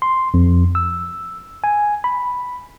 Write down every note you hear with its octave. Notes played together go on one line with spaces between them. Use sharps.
C6
F2
E6
G#5
B5